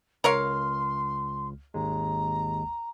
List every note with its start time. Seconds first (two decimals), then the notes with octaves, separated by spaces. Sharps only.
0.24 C#2 A#4 C#5 F5 C6
1.74 G#1 D#2 G#3 A#5